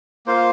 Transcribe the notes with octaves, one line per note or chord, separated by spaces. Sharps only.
A#3 F4 C5 F5